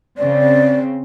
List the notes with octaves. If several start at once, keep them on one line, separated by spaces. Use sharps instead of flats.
C#3 C4 D5